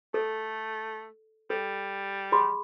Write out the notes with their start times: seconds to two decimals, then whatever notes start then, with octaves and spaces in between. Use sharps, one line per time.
0.14 A3 A4
1.50 G3 A4
2.32 G#4 B5 C6